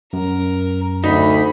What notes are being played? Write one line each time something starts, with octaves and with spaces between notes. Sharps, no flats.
F#2 A#4
D2 D#4 B5